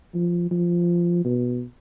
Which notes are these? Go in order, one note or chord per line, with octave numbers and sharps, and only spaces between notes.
F3
F3
B2